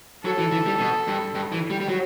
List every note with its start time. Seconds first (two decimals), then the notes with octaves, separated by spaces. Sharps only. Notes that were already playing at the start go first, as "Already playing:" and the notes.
0.25 F#3 A4
0.39 E3
0.52 E3
0.67 G3
0.80 B2
1.07 G2
1.35 G2
1.52 E3
1.70 G3
1.81 G3
1.88 F#3